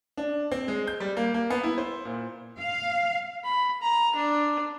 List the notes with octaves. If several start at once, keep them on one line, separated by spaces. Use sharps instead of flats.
D4
C4
G#3
G6
G3
A#3
A#3
B3
E4
C5
A#2
F5
B5
A#5
D4